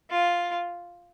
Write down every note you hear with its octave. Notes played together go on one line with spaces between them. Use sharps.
F4